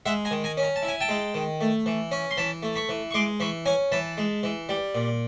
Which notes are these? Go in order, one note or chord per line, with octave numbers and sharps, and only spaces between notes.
G#3 E5 F#5
G#5 A#5
D#3
G#5 A#5
C#4
A#5
A5
E4
G#5
G5 A5
G#3
D#3
A3
E3
C#4
C6
E3 A5 B5
A3
B5 C#6
E3
C#6
G#3 C6 D6
E3 B5 C#6
C#4 G#5 A#5
E3 A5 B5
G#3
E3
G3
A#2